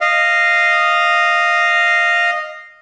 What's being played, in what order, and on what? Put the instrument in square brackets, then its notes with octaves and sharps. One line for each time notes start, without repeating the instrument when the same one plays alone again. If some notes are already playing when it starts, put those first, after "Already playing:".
[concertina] D#5 F5